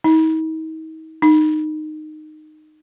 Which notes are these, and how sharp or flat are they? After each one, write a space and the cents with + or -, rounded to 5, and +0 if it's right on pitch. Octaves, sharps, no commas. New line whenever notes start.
D#4 +40
D#4 -15